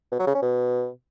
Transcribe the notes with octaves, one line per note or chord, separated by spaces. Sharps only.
B2
F#3
C#3
C#4
B2